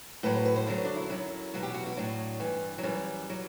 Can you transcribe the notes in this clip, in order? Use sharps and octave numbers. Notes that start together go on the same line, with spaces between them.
A2 F#3 B4
C5
B4
C5
F#2 D3 F#3 C5
D4
E4
F#2 F#3 E4
E2 B2 F#3
G4
F#4
E4
A2 F#3 D4
G2 E3
F#3
F#2 E3 G3
F#3